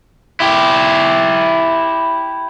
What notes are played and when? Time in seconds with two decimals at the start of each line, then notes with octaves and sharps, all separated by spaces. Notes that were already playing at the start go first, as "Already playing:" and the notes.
0.40 E4 G4